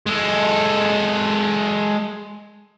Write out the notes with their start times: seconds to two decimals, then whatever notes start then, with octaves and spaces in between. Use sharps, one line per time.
0.07 G#3 A4